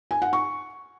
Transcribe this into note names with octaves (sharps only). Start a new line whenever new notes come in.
G#5
F#5
C#6